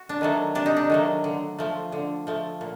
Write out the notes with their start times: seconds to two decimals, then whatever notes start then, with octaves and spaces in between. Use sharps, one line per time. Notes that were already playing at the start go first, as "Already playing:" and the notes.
Already playing: F#4
0.09 D4
0.21 D#3 F#3 A3
0.55 C3 D4
0.66 D#4
0.77 D4
0.90 D#3 F#3 A3
1.24 D3
1.59 F3 A3
1.92 D3
2.27 F3 A3
2.61 A#2